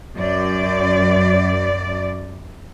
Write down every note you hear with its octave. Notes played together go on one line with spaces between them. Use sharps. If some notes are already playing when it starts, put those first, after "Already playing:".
F#2 D5